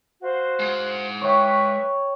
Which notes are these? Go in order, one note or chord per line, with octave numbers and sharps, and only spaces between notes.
F#4 C5 F5
G#3 F#5
B4 C#5 E5 G5 C#6